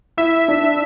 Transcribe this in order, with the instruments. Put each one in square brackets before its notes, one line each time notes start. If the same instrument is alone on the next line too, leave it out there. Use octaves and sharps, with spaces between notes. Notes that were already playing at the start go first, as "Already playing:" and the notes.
[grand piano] E4 [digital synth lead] E5
[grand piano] D4